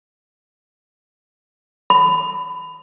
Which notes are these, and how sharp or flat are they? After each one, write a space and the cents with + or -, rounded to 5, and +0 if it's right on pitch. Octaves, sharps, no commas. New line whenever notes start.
B5 +25